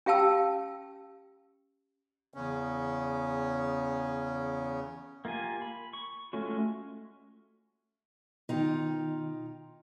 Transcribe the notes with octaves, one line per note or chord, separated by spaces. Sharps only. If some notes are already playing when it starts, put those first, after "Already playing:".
C#4 G4 F5 G5 A5 E6
E2 C#3 C#4
A#3 F4 G4 G#5
B5
C#6
G#3 A3 C#4 F4 F#4
B2 D#3 D#4 F4 G5